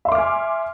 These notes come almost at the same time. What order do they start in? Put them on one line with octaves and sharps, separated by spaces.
E5 C6 D6 F6 G#5